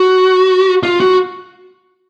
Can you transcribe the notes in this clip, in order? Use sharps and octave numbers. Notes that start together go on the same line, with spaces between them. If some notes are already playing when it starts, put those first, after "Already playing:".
Already playing: F#4
F4
F#4